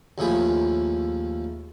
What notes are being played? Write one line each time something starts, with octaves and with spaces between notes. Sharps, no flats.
D#2 A2 F3 G#4 B5